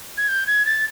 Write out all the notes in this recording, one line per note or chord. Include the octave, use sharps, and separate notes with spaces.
G#6
G6
G#6
A6